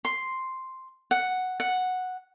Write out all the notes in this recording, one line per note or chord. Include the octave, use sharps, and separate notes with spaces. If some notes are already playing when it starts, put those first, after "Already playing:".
C6
F#5
F#5